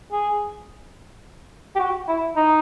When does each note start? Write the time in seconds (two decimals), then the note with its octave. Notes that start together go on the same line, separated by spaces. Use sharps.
0.12 G#4
1.75 G4
1.79 F#4
2.08 E4
2.36 D#4